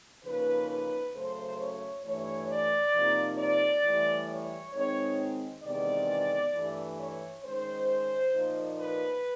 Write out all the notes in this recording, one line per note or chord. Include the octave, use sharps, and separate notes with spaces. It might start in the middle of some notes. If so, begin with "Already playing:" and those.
C#3 F3 A#3 D#4 B4
B4
F#2 C#3 F#3 A3 C5
C#5
G2 E3 A3 C#5
D5
C3 F3 A#3 D#4
D5
A2 E3 G3
C#5
D#3 G#3 C4 D#4 C#5
E2 C3 D#3 G#3 B3 D5
G2 E3 A3
C#5
D#3 G#3 C#4 C5
A#2 F3 A#3 D#4
B4